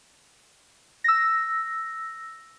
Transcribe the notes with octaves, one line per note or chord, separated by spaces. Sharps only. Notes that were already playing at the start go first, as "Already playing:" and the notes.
E6 A#6